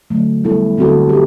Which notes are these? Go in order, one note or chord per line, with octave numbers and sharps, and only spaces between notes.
D3 F#3 A3
G3 B3 E4 A4
D3 F#3 C4 F#4 A4
G4